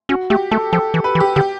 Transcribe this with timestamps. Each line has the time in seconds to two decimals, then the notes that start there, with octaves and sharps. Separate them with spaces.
0.09 C#4 F#4
0.30 A3 G4
0.51 A3 A4
0.72 F3 A4
0.94 E3
1.04 B4
1.15 E3
1.20 G4
1.36 D3 G4